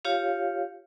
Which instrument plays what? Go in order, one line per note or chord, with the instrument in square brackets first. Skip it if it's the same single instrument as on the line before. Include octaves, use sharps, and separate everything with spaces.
[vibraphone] F4 G4 C#5 F5